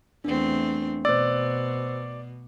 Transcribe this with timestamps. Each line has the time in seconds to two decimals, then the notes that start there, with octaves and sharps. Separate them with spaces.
0.25 E2 A3 C4 D4
1.05 B2 C5 D5 E6